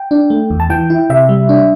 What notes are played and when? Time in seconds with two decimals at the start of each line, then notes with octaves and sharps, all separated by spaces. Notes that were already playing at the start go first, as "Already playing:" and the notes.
Already playing: G5
0.11 D4
0.30 A3
0.50 E2
0.60 A5
0.70 E3 G5
0.90 E4
1.10 C3 E5
1.29 G3
1.49 D4